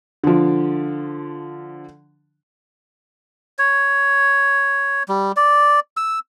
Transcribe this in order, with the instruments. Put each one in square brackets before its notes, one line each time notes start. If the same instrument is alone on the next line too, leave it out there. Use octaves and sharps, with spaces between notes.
[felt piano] D3 F3
[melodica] C#5
G3
D5
E6